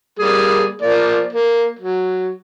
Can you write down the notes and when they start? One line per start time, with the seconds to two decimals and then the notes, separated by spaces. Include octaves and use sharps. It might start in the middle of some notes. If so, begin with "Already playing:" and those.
0.19 G3 A#3 G#4
0.82 F3 A#3 D5
1.33 A#3
1.79 F#3